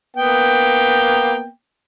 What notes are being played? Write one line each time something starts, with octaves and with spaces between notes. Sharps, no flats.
A#3 B3 G5